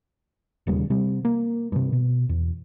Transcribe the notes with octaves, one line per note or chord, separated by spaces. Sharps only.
E1 D#2 C#3 G3
C3 G3 C4
A#3
G2 C3
B2
E2